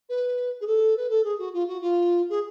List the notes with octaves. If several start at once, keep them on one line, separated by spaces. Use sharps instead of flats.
B4
G#4
A4
B4
A4
G#4
F#4
F4
F#4
F4
G#4